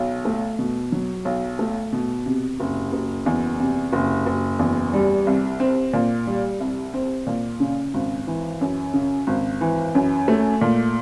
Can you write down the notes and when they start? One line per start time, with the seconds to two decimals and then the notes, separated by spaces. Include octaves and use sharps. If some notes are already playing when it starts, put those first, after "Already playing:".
Already playing: B1
0.25 A3
0.59 B2
0.92 F#3
1.25 B1
1.59 A3
1.92 B2
2.26 C3
2.60 F#1
2.93 F#1
3.26 E2
3.60 C3
3.93 F#1
4.26 F#1
4.59 E2
4.94 G3
5.27 C2
5.60 C4
5.93 A#2
6.27 G3
6.60 C2
6.94 C4
7.27 A#2
7.60 C#3
7.94 G#1
8.27 E3
8.61 F#2
8.94 C#3
9.27 G#1
9.61 E3
9.95 F#2
10.28 A3
10.61 A#2